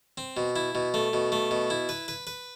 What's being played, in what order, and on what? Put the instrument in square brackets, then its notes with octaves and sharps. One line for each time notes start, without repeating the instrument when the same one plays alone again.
[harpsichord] C4
B2
E4
B2
A3
B2
A3
B2
E4
B4
B4
B4